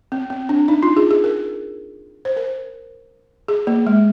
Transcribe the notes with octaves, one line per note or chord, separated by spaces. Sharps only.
C4
C4
D4
D#4
F4
G#4
G#4
A#4
C5
A#4
G#4
A#3
G#3